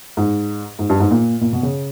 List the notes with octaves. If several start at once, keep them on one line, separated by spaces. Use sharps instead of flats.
G#2
G#2
G2
G#2
A#2
A#2
B2
C#3